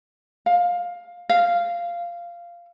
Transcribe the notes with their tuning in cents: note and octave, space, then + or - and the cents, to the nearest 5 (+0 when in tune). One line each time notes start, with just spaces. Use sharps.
F5 +15
F5 -10